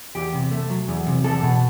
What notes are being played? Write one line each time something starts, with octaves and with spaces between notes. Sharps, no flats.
E2 G4
C3
A3
F#3
E2
C3
E2 A4
B2